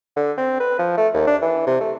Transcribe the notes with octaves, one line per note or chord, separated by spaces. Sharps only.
D3
C4
B4
F3
A3
D#2
D4
E3
C3
A3